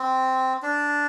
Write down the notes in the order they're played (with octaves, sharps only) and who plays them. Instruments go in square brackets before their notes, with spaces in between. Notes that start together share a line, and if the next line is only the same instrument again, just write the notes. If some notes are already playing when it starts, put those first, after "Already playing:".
Already playing: [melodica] C4
D4